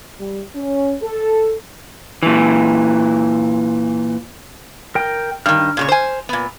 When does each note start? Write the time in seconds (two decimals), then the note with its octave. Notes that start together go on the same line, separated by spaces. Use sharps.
0.19 G3
0.54 C#4
1.01 A4
2.23 A#2 E3
4.95 A#4 G5
5.46 G2 D#3 F6
5.77 A#2 C#3 C#5
5.89 C5 G#5
6.29 A#2 B3